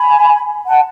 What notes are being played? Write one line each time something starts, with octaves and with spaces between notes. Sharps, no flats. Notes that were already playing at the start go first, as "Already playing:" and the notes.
Already playing: G#5 B5
F#5 A5